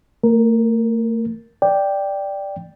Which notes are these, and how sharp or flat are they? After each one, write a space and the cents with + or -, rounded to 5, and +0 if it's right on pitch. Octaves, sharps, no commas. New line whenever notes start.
A3 +45 A#4 +0
D5 +0 G5 +0